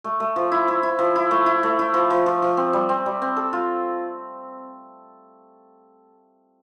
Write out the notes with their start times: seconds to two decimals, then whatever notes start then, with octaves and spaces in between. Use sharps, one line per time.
0.04 A3
0.20 A3
0.36 F3
0.52 E4
0.68 E4
0.83 E4
0.99 F3
1.16 E4
1.31 A3
1.46 E4
1.63 A3
1.79 E4
1.94 F3
2.10 F3
2.26 F3
2.42 F3
2.57 C4
2.73 G3
2.89 C4
3.06 G3
3.22 C4
3.37 A4
3.53 F4